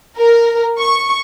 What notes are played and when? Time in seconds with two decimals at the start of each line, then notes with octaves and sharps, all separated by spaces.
0.17 A#4
0.79 C#6